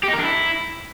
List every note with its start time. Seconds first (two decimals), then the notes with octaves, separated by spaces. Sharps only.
0.03 G4
0.08 D#4
0.13 A#4
0.18 D4
0.23 E4